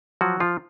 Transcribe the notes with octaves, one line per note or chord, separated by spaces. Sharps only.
F3 F#3 F#4
F3 F4